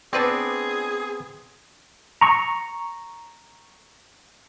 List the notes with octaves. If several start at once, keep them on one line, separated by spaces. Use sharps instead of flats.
B3 C4 D4 G#4 B4 D5
A#5 C#6